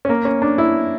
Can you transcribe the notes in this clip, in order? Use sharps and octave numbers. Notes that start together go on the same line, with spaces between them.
C#4
A#3
C#4
D4
E4